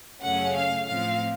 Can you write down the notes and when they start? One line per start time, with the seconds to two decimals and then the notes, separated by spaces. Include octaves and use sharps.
0.23 F#2 C#3 A3 C#4 F#5
0.55 F5
0.88 A2 F3 C4 F5